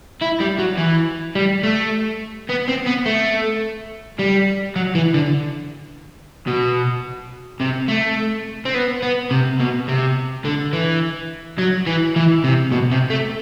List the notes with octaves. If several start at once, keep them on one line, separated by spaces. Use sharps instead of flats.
E4
G3
F#3
E3
G3
A3
B3
C4
B3
A3
G3
F#3
E3
D3
B2
C3
A3
C4
B3
B3
C3
B2
C3
D3
E3
F#3
E3
E3
C3
B2
C3
A3